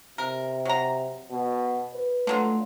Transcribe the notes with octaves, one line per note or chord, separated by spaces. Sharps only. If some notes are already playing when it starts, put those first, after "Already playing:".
C3 A#4
F#3 A#5
B2
B4
D3 F#3 A3 F4